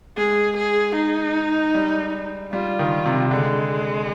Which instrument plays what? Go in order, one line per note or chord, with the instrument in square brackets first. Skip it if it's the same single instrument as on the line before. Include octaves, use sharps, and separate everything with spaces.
[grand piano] G#3 [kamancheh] G#4
[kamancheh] G#4
D#4
[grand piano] G3
[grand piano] G3 [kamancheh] F4
[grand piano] D#3
C3
[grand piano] D3 [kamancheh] G#3